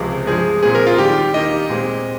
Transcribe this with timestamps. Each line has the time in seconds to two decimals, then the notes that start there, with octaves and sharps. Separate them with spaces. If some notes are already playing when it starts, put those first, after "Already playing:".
Already playing: C#2 C3 F3 G#3
0.27 G2 F3 G#3 G#4
0.63 A#2 F3 G#3 C4 G#4
0.75 A#4
0.87 F4
0.98 D#2 D#3 G3 G4
1.34 D#2 D#3 A#3 D#5
1.69 A#2 G#3 C4 G4